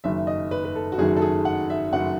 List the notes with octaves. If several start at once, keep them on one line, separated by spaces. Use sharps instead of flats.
F#1 F#2 D#3 E5
D#5
B4
B4
A4
F#4
F#1 F#2 D#3 G#4
A4
G#4
F#5
E5
F#1 F#2 D#3 F#5